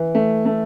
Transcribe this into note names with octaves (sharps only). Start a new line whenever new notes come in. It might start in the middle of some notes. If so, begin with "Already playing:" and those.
Already playing: E3
A3
A3